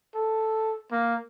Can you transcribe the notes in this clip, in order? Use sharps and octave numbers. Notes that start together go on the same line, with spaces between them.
A4
A#3